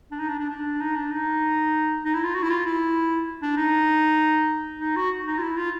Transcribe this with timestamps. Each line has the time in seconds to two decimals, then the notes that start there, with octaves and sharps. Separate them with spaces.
0.11 D4
0.19 D#4
0.29 D4
0.39 D4
0.49 D4
0.80 D#4
0.95 D4
1.11 D#4
2.04 D#4
2.14 E4
2.23 F4
2.35 F#4
2.43 E4
2.50 F4
2.65 E4
3.42 D4
3.57 D#4
4.80 D#4
4.96 F#4
5.27 D#4
5.38 F4
5.42 E4
5.57 F4